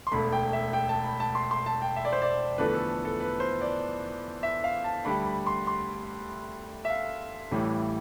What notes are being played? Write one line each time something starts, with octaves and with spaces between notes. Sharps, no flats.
C6
E1 D2 D3 B5
G5
E5
G5
A5
B5
A5
C6
C6
A5
G5
E5
D5
C5
D5
E2 D3 F3 A3 B4
A4
A4
B4
C5
D5
E5
F5
A5
D2 D3 G3 B5
B5
C6
C6
E5
F5
A1 A2 E3 G3